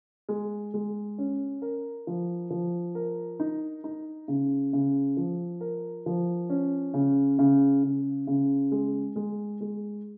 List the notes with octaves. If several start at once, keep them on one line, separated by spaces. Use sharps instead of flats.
G#3
G#3
C#4
A#4
F3
F3
A#4
D#4
D#4
C#3
C#3
F3
A#4
F3
C#4
C#3
C#3
C#3
C#3
G#3
G#3
G#3